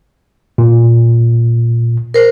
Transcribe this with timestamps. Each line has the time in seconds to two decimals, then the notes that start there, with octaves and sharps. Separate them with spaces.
0.58 A#2
2.14 A#4 C5